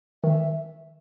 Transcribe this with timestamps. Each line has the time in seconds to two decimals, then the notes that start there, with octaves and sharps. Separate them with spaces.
0.23 D#3 E5